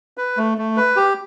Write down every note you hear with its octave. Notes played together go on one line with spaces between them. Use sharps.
B4
A3
A3
B4
G4